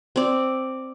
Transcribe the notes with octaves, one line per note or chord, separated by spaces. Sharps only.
C4 D5